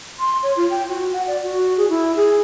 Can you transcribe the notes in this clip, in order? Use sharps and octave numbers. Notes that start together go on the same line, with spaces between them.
C6
C#5
F4
G5
F#4
F#5
D5
F#4
G#4
E4
G#4